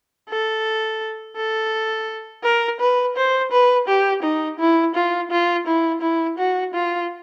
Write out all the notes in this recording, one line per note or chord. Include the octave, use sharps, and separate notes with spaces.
A4
A4
A#4
B4
C5
B4
G4
D#4
E4
F4
F4
E4
E4
F#4
F4